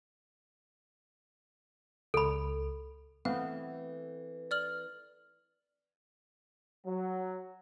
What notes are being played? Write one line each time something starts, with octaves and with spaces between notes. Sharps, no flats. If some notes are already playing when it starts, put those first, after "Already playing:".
C#2 A4 B5
E3 A3 B3 C4 F5
D5 F6 F#7
F#3